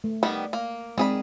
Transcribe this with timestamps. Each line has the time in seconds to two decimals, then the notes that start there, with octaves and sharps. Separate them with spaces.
0.04 A3
0.23 D#3 G3 B3
0.53 A#3
0.98 D#3 G#3 C4 G#4 D5 B5